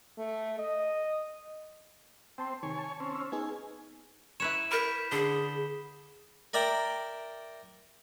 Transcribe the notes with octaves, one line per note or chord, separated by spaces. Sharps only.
A3
D#5
C4 G5 A5 C6
C3 D#3 C#5 G#5
A5
C4 C#4
E6 F6
B3 D#4 G#4 G#5
E4 B4 C#5 E7
A#4 B5 G6 B6
D3 G#4 G7
A#4 D5 E5 G5 A#5